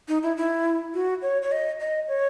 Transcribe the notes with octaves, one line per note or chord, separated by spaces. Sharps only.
D#4
E4
E4
F#4
C#5
C#5
D#5
D#5
C#5